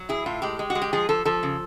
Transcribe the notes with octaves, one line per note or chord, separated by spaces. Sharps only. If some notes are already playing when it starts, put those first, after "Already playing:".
Already playing: F#3
E4 G#4
A2 F4
G#3 G4
G#3
F#4
G#3
G4
F3 G#4
F3 A4
F3 A4
C#3